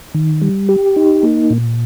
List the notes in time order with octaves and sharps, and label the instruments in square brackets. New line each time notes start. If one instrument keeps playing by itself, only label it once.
[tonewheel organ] D#3
G3
G4
D#4
A#3
A#2